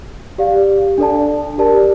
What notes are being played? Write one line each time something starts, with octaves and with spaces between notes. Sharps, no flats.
G4 D5 F5
D4 A4 D5 A5
G4 A#4 D5 A5